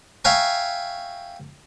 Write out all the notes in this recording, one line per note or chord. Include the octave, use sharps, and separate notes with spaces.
E5 F5 G5 G#5 A#5 C#6